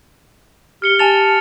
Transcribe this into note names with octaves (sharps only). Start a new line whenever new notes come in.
G4 F6 C#7 G7
G#5 A5 A6 F7